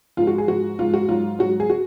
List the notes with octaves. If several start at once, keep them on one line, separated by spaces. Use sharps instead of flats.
G#2 F3 G#3 F4
F#4
G#4
G#2 F3 G#3 F#4
G#2 F3 G#3 F4
F#4
G#2 F#3 F4
G#2 F#3 F#4
G#4
F#4